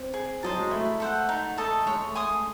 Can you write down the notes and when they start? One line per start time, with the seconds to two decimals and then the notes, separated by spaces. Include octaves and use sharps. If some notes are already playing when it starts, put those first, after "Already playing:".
Already playing: C4
0.14 G#4
0.43 F#3 C5 D#5 A5
0.58 G#3
0.71 A3 E4
1.00 A4 C5 F#5
1.29 D#4
1.58 A4 D#5 A5
1.86 G#3 C#5
2.06 A3
2.15 G#5 C6 D#6
2.25 A3